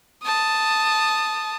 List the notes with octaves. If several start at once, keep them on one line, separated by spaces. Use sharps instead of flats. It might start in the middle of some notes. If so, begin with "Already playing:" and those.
A5 D#6